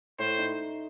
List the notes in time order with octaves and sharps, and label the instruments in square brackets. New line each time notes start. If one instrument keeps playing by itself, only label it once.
[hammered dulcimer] A2 [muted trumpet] C5
[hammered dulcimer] D#4